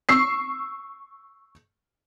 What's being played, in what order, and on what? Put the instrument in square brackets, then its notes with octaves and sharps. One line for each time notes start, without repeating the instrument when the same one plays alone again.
[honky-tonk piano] C#6 E6 C7